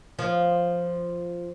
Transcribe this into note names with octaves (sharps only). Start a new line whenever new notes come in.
F3